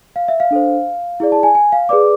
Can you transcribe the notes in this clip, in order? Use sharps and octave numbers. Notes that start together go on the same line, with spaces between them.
F5
E5
F5
D4 A4 C5
E4 G#4 D5
A5
G#5
G#5
F5
G#4 B4 D5 D6